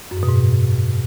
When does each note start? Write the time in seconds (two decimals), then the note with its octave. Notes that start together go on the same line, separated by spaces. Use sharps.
0.11 F#2
0.17 G#2
0.23 B2
0.29 G#2